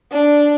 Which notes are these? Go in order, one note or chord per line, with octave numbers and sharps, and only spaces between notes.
D4